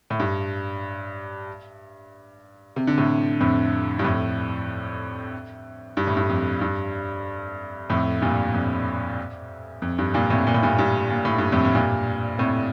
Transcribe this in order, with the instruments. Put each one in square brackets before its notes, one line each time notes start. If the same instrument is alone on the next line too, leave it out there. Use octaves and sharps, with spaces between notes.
[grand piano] A2
G2
C3
D3
A2 C3
F2 A2
G2
F2 A2
G2
A2
G2
F2
G2
F2 A2
G2 A#2
F2
F2
G2
G2 A#2
A2 C3
A#2
A2
G2 A#2
G2
A#2
A2
G2
F2 A2
A2
G2 A#2
A2 C3